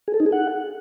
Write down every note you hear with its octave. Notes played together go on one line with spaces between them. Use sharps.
G#4
A4
D#4
G#4
F#5